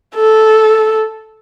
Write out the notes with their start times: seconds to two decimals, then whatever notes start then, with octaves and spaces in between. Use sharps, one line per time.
0.15 A4